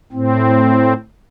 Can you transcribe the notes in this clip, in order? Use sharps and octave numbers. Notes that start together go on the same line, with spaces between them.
A2 C4